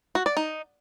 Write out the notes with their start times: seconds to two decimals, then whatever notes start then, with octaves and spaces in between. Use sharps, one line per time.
0.15 F#4
0.26 D5
0.37 D#4